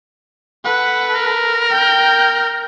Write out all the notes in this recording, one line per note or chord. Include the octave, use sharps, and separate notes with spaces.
A4 B4 F#5
A#4
G5 G6